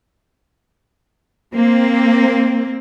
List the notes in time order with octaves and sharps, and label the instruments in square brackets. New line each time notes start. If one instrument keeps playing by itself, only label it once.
[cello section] A#3 C4